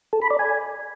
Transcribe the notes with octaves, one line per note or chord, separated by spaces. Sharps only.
A4
B5
D5
G#5